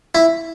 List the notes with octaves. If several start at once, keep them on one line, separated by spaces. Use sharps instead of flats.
E4